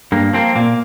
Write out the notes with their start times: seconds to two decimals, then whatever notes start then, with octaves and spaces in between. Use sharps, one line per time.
0.12 G2 A#3
0.33 F3 A#3 C4
0.55 A#2 A#3